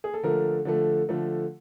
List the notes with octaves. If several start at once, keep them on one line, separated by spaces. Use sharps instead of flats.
G#4
A4
D3 F3 A3 A#4
D3 F3 A3
D3 F3 A3